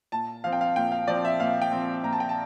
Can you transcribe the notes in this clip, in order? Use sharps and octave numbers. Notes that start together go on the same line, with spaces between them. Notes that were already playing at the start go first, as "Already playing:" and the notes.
A#2 A5
F3 C4 F5
G5
F5
A#2 G5
F5
F3 C4 D5
E5
A#2 F5
G5
F3 C4
A#2 A#5
A5
G5
A5